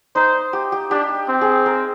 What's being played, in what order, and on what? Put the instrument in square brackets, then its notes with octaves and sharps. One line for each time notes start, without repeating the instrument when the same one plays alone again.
[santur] D#4 [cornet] C5
[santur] G4
G4
[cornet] D4 [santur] G4
[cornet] C4
[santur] G#4
A#4